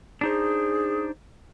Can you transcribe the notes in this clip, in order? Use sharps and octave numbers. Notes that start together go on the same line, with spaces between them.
D4 D#4 G#4 C5